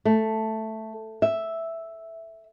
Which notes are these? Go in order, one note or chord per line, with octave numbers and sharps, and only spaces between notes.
A3
E5